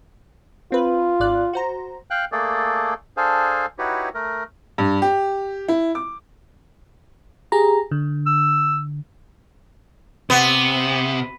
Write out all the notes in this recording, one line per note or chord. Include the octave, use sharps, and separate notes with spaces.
C4 F4 B4
G#1 D5 F#6
F#4 C5 A#5
F5 G5 F#6
A3 A#3 G#4 A4 D5
D4 G#4 A4 C5 F5 G#5
D#4 E4 F#4 G4 B4 C#5
A3 A#4
G2
G4
E4
D6
G4 G#4 A#5
D3
E6
C3 B3